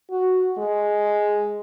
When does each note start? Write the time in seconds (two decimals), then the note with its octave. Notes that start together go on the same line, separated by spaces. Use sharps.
0.11 F#4
0.58 G#3